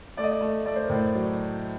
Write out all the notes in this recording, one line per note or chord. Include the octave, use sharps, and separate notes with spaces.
A3 D5
D#5
D5
A3
A3 D5
C5
A#4
A2 C5
F#3 D5